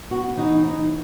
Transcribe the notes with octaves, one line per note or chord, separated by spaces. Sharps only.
B3 F#4
E3 D#4
E3 D#4